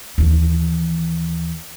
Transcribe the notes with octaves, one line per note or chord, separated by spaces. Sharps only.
D#2 E3